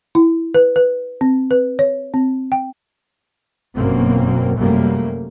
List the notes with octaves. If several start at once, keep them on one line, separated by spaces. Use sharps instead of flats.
E4
B4
B4
C4
B4
C#5
C4
G5
G1 F#2 B2 A#3 C4
F#2 C3 G3 A3 A#3